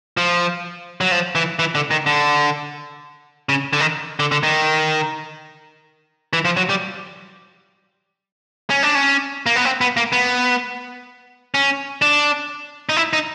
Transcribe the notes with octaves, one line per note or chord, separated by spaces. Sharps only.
F3
F#3
F3
E3
E3
D3
D#3
D3
C#3
D3
D#3
D3
D3
D#3
E3
F3
F#3
G3
C#4
D4
C#4
A#3
B3
C4
B3
A#3
B3
C#4
D4
D#4
E4
D#4